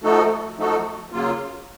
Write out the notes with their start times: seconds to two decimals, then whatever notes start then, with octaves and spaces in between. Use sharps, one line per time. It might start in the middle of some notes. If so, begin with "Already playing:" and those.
0.03 F3 A3 D#4 F#4 A4
0.58 F3 A3 D#4 F#4 A4
1.12 C#3 F#3 A#3 F4